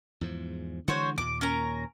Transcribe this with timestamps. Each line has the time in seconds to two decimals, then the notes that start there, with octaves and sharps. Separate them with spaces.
0.21 E2 G#2 F3
0.88 D3 E3 G#3 F#4 C5 C#5
1.18 D#2 A#2 D6
1.41 C#4 A#4 A#5